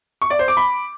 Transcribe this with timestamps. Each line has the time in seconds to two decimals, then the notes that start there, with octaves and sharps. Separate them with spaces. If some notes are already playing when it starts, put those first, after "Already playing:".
0.22 C#6
0.30 D5
0.39 C5
0.48 D6
0.57 B5